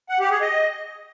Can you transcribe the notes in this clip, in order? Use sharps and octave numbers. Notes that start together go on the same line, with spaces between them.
F#5
G4
G#4
D#5